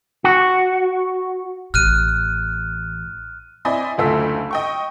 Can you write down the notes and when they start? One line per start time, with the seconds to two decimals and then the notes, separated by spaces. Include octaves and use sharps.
0.24 F#4
1.74 A1 F6 F#6 D#7
3.65 C4 E4 D5 D#5 G#5 B5
3.98 F#1 D2 A3 F4 E6 B6
4.51 D#5 G5 C#6